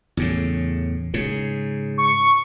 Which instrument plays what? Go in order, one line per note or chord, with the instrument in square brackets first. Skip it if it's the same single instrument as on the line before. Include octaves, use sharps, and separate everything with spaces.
[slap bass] E2 A2 C#3
G#2 C#3
[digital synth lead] C#6